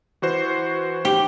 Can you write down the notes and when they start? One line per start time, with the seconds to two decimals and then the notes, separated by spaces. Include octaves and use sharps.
0.22 E3 F#4 C5
1.05 G4